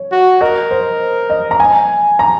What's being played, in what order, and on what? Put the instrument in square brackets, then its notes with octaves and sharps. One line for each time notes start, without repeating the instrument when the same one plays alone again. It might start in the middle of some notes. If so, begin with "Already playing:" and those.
Already playing: [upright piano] C#5
[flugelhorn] F#4
[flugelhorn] A#4 [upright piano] D#5
[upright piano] C5
D#5
A#5
G#5
A#5